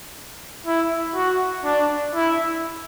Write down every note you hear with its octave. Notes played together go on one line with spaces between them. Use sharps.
E4
F#4
D4
E4